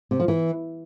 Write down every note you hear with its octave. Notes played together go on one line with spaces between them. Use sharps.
C3
F3
E3